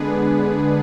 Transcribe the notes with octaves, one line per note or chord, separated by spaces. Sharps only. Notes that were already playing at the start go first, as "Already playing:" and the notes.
Already playing: D3 G#3 B3 D4 G#4 B4